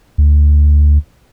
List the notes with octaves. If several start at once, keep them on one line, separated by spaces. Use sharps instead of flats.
D2